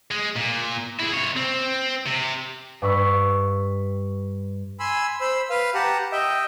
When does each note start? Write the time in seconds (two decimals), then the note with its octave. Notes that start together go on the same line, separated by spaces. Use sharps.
0.11 G#3
0.36 A#2
1.00 E4 G#4
1.13 C3 C#5
1.37 C4
2.06 C3
2.82 G2 B5 C#6 E6
4.80 G#5 B5 C6 E6
5.21 C5 B5 E6
5.50 B4 F5
5.75 G4 F#5 A5 A#5
6.12 D#5 E5 G5